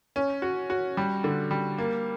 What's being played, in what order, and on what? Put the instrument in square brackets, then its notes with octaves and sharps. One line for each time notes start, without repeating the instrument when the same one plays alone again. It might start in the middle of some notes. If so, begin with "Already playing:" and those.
[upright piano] C#4
F#4
F#4
G3
D3
G3
A#3